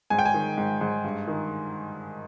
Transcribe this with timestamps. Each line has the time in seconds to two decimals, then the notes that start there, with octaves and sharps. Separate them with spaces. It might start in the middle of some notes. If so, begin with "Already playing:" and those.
0.10 G#2 G#5
0.19 G5
0.26 G#5
0.34 D#3
0.58 G#2
0.81 G#2
1.04 G2
1.28 D#3